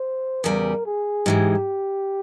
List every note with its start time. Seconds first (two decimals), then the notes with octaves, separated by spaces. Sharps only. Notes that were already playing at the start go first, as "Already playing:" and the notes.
Already playing: C5
0.44 E2 C#3 G3 A#4
0.86 G#4
1.26 G#2 E3 G#3 G4